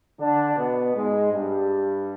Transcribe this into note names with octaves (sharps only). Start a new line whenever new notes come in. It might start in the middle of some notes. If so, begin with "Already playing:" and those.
D3 D4
B2 B3
G#2 G#3
G2 G3